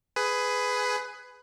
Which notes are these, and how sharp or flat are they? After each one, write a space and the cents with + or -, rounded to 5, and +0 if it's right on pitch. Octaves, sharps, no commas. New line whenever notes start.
G#4 +5 B4 +15